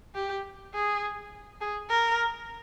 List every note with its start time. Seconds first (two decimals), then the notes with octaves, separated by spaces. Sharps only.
0.15 G4
0.74 G#4
1.61 G#4
1.89 A#4